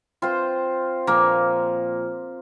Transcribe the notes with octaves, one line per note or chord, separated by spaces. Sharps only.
C4 F4 C5
A#2 F3 A#3